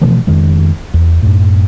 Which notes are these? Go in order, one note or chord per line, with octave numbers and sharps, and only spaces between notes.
B2 E3 F3 A3
F2 D#3 G#3
E2
F#2 A2